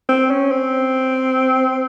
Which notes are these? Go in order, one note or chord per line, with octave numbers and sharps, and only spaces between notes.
C4
C#4
C4